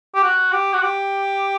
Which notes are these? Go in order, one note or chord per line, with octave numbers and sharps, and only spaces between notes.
G4
F#4
G4
F#4
G4